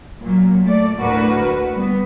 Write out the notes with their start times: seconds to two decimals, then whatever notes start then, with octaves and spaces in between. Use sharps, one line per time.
0.22 A#2 F#3
0.64 A3 D5
1.01 D2 A2 F#4 A#4 B4
1.73 G3 B3